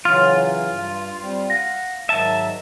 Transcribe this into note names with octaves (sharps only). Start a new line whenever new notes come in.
C#3 E3 F#3 F4 F6
G2
G3 C4
F5 F#5 A#6
G#2 D#3 F#3 E5 A5